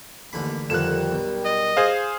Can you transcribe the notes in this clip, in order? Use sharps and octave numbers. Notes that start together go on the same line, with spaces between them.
A1 D#2 D3 B5
F2 D3 D#3 G3 G4 A#4 F#6 E7
B1
D#5
G#4 C5 F5 G#5